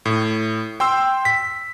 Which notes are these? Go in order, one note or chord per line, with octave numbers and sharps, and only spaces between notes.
A2
G5 C6 E6
B6